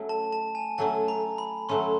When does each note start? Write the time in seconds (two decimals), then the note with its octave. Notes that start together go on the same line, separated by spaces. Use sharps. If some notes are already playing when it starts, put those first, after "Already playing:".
Already playing: F#3 A3 C#4
0.09 A5
0.32 A5
0.55 G#5
0.78 F#3 A3 C#4 A5
1.08 A#5
1.38 B5
1.69 F#3 A3 C#4 C6